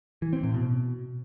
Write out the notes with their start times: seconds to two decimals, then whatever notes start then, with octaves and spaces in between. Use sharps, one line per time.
0.22 E3
0.33 C4
0.43 A2
0.54 B2